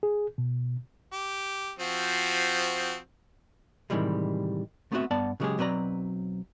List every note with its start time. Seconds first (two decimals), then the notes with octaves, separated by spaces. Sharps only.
0.03 G#4
0.38 B2
1.12 G4
1.79 F3 C4 F#4
3.90 A2 C3 D#3 E3 G3 G#3
4.92 A3 B3 C4 D#4 F#4 E5
5.11 G2 B3 D5 F#5 A5
5.40 C#3 F#3 G#3 E4 G4 G#4
5.58 B1 F#3 C4 B4 D5 A#5